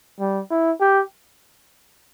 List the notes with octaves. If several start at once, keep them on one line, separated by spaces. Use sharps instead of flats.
G3
E4
G4